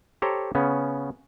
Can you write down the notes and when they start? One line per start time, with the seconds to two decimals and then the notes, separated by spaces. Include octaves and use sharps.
0.22 G4 A4 C5 C#5 A#5
0.55 C#3 B3 C#4